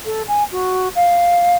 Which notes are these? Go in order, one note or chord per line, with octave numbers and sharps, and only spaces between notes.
A4
G#5
F#4
F5